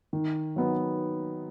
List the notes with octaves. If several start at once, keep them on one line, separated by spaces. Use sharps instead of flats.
D#3
F#3 B3 D#4